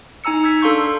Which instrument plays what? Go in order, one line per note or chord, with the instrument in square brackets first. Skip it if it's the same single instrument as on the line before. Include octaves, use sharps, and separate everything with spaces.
[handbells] D#4 G#5 A#5 E6 C#7
E6 G#6 B6 C#7
D4 A4 F5 C6 C#6 G6